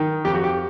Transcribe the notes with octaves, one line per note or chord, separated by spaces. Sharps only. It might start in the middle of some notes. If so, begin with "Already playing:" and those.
Already playing: D#3
F2 G4
F#4
G4